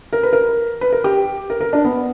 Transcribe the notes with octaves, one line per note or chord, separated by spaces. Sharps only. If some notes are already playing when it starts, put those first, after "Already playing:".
A#4
B4
A#4
B4
A#4
G4
A#4
A#4
D4
B3